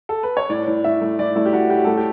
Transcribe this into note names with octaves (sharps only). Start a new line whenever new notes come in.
A4
B4
C#5
A2 D5
A2
A2 E5
A3
A2 D5
A3 E4
G4
A3 F#4
A2 G4
A3 A4
G4